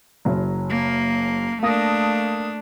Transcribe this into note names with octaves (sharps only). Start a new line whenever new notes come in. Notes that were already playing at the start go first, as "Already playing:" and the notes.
F#1 F#3
A#3
A3 A#3 D4 D#6 A#6